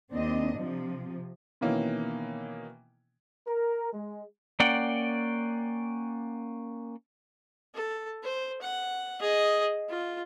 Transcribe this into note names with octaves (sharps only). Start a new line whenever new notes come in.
D#2 C4 D4 D#5
C3 F3
B2 D#3 E3 A#3 C#4
A#4
G#3
A#3 C#4 D5 F#5 G5
A4
C5
F#5
G#4 D#5
F4